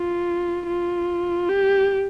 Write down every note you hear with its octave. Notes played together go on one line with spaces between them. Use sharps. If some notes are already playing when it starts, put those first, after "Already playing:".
Already playing: F4
F4
G4